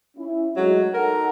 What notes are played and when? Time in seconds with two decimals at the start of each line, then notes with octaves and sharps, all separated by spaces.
0.17 C#4 E4
0.56 F#3 G#3 A3 D#4
0.94 D#4 A4 A#4 F#5